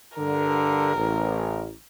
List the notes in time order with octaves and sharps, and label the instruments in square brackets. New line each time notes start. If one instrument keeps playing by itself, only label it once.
[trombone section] G2 D3 [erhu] A#4
[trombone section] A1